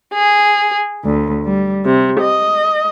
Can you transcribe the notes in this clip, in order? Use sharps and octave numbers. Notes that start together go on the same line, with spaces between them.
G#4
D2
G3
C3
D#5